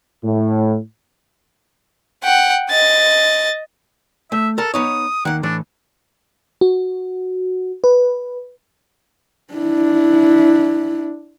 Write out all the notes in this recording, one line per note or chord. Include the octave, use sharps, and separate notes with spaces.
A2
F#5 G5
D#5 A6
A3 E5
A4 A#4 A5
B3 D#4 C#5 D#6
D#3 A#3 F#5
A2 E3 D4
F#4
B4
D4 E4